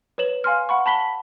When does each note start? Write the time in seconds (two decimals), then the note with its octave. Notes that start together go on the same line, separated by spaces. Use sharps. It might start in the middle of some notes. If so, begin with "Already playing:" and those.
0.18 B4 C#5 E7 F#7
0.44 F5 G#5 C6 F6
0.69 F#5 B5 C#6
0.86 A5 B5 B6 G7